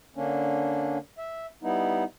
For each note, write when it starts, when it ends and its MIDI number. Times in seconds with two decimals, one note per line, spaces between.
0.16 0.98 50
0.16 0.98 58
0.16 0.98 61
0.16 0.98 62
1.18 1.46 76
1.63 2.04 55
1.63 2.04 59
1.63 2.04 63
1.63 2.04 64